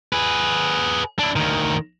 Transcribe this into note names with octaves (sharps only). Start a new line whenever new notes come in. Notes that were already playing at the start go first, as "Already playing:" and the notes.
G#4 B4
D4 E4
D2 D#3